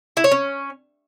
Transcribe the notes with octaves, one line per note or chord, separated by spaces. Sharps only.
E4
C#5
C#4